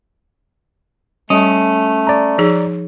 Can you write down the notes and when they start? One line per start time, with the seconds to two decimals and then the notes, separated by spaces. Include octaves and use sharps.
1.30 G3 A3 C#4
2.07 D5 A#5
2.38 F3 D#4 G#4